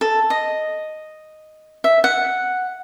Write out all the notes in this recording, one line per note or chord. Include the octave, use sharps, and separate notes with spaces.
A4
D#5
E5
F#5